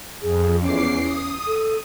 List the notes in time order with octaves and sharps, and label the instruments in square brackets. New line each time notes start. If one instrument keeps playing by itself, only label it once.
[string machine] F2 [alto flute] G#4
[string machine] E2 D6 C7 [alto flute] C#4
[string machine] D#6
[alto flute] A4